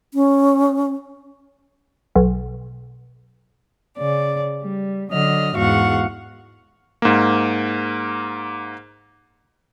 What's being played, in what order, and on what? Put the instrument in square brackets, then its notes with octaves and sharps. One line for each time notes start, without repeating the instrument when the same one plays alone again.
[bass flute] C#4
[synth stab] B1
[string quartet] C#3 D5
G3
D3 F#3 D#5 F6
E2 G#2 F#4 F5 F#5 C#6
[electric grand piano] G#2 A#3